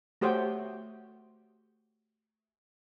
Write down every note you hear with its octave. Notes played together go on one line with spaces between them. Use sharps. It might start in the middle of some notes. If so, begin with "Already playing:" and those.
A3 F#4 G4 C5 C#5 G5